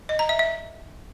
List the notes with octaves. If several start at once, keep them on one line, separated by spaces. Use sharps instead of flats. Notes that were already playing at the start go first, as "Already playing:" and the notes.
D#5
A#5
E5
E5